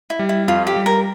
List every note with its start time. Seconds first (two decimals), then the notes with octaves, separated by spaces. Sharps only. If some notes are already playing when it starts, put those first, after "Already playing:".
0.10 E4
0.19 G3
0.29 E4
0.48 F2 F4
0.67 G4
0.76 G3
0.86 A#4